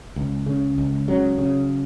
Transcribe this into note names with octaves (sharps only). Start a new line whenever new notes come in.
C#2
C#3
C#2
C#3 F#3
C#3